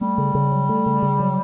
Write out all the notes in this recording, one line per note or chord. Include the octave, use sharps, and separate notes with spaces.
G3 A3
C#3
C#3
F#3
A3
C#3
C#3
F#3